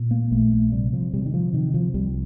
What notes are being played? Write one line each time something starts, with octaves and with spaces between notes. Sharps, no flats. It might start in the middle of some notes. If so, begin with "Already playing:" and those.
Already playing: A#2
A#3
A#1 A3
A3
C3 G3
F3
C3 G3
D#3
F3
C3 D#3
F3
C2 G3